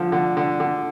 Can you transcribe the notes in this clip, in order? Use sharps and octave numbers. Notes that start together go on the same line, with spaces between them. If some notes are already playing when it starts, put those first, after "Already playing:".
Already playing: D3 F3
D3
D3
D3